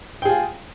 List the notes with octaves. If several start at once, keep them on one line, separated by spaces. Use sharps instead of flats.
F4 G#4 G5